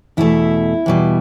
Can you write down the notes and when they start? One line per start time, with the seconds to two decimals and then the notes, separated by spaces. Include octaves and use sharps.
0.17 E2 B2 A3 E4
0.86 E2 B2 G3